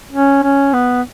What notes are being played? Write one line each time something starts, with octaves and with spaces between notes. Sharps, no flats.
C#4
C#4
B3